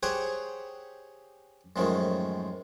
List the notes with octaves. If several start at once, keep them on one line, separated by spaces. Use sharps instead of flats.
G4 G#4 C5 C#5 F#5 D#6
F#2 A2 D#3 F3 G#3